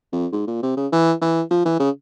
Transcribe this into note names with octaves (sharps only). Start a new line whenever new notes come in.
F2
G#2
A#2
C3
C#3
E3
E3
F3
E3
C#3